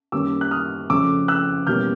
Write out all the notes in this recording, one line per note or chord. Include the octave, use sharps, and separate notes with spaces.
F#2 D#3 G3 A#3 C#4 D6 E6
F#6
D#6 F6
F2 C#3 F#3 A3 D6 E6
E6 F#6
E2 B2 G3 A#3 C#4 F6 G6